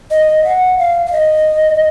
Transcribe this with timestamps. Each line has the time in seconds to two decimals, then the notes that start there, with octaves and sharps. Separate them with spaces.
0.11 D#5
0.44 F#5
0.78 F5
1.06 F5
1.12 D#5